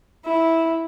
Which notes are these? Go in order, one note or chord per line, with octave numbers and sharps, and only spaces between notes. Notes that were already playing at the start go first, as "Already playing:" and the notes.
E4